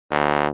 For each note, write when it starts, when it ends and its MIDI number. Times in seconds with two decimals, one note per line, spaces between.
0.11 0.47 38